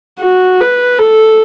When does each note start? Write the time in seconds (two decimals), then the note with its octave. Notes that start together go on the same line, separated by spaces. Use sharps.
0.20 F#4
0.60 B4
0.99 A4